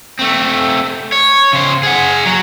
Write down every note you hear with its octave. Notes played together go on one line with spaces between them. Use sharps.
A3 C4
C#5
C#3 C5
G#4 F#5
F#3 F#4